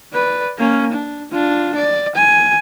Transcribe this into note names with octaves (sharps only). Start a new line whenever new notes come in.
B4 D5
A#3 C#4
D4
D4 F4
D5
G#5